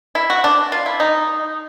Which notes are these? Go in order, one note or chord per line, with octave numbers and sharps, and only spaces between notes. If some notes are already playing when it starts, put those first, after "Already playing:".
E4
F#4
D4
F4
E4
D#4